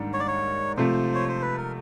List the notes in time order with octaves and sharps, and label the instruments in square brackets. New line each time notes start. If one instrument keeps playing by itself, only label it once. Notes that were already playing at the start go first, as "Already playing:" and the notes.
Already playing: [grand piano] G#2 D#3 G3 A#3 D4
[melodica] C#5
D5
C#5
[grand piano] C3 F3 A3 [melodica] C5
[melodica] C#5
C5
B4
A#4